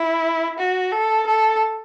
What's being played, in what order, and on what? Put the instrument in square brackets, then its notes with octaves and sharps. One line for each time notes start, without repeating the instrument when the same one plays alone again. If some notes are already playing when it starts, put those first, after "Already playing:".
Already playing: [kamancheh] E4
F#4
A4
A4